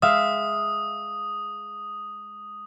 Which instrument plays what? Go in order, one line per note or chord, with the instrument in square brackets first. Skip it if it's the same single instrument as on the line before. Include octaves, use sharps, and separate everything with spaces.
[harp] G#3 E5 F5 [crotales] D#6